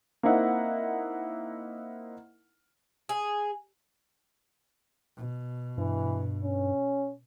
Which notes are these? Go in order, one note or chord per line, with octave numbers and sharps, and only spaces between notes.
A#3 C4 D#4 E4 F#5
G#4
B2
G2 E3
C#4